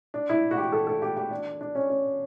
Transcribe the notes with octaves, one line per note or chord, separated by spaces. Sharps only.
D4
E4
F#4
G4
A4
A4
G4
G4
D4
D4
C#4
C#4